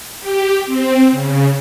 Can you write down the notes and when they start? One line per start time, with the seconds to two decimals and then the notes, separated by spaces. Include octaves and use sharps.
0.20 G4
0.66 C4
1.11 C#3